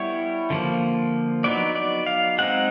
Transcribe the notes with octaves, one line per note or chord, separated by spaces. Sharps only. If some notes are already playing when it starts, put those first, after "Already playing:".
Already playing: G3 B3 E4 C#5
D3 F3 A#3
F#3 B3 D#4 D5
D5
F5
G#3 C4 D#4 F#5